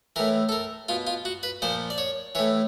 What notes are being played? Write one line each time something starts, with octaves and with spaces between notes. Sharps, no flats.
A2 E3 A#4
A4
A#4
B2 F4
F4
F#4
B4
A#2 F3 C5
D5
C#5
A2 E3 C#5